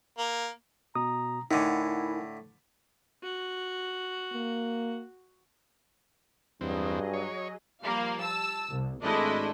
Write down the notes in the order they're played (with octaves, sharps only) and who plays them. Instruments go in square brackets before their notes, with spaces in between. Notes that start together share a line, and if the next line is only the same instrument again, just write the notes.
[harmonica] A#3
[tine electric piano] B2 [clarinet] A#5 [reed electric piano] D#6
[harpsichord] A2 D3 [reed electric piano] D#4 [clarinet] E4 [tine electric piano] A#4 F#5 G#5
[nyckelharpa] F#4
[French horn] A#3
[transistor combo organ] E2 C4 [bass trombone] G2 [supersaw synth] F#3 G#4 D#5
[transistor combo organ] C#5
[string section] F3 G3 A#3 F5
A5 E6
C2
G#1 G#3 A3 D4 E4 D#5